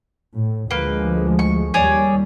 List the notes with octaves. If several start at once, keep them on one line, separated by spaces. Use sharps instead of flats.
A2
D2 F3 G#3 A#3 B4
C#6
D#2 G3 G#4 C#5 D5